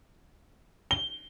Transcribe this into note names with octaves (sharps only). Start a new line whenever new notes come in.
G7